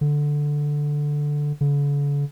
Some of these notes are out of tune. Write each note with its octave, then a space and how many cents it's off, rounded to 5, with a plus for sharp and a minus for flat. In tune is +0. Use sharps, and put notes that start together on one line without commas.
D3 +0
D3 -45